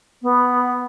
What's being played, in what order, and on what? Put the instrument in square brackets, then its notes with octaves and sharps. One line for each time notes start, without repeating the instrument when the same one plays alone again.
[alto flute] B3